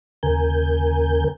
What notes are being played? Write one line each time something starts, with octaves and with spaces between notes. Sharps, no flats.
D#2 C#3 A#4 G#5 G6